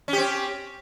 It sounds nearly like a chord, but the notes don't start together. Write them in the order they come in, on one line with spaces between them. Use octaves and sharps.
C#4 G4 C4